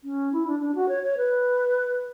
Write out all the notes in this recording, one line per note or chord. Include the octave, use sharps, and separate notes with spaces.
C#4
E4
D4
D4
F#4
C#5
C#5
B4